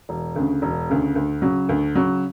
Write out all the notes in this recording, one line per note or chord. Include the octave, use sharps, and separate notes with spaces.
E1
D2 C#3
E1
D2 C#3
D2
C#3 F#3
D2
C#3 F#3